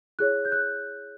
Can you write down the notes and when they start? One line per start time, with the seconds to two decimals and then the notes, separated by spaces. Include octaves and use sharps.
0.19 E4 G#4 C#5 F#6
0.45 G6
0.52 F#6